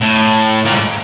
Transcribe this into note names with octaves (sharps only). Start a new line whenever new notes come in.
A2
A#2
G#2